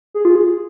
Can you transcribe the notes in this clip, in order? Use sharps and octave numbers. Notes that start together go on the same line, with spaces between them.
G#4
F4
G#4